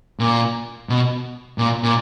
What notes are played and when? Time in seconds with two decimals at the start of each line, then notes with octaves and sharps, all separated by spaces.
0.20 A#2
0.89 B2
1.58 A#2
1.83 A#2